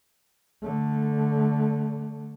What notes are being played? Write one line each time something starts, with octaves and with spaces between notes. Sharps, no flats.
D3 A3